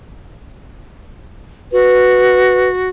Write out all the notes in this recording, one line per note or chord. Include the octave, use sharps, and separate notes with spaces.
F#4 B4